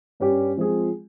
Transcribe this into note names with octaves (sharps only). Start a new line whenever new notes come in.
G2 G3 C#4 G4
F3 G#3 C4 F4 G#4